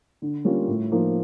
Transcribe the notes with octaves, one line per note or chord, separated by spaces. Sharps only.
D3
G3 A#3 C#4 F4
A2
F3 A#3 D#4